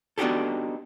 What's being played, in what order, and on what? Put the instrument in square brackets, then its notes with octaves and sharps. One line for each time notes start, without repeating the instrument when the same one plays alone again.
[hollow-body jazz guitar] B3 D4 D#4 F#4 G4 A4